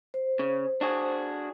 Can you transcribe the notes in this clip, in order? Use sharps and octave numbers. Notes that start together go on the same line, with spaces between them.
C5
C#3
D4 F#4 G#4